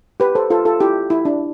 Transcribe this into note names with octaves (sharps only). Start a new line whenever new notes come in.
G4 B4
A4 C5
F4 A4
F4 A4
E4 G4
E4
D4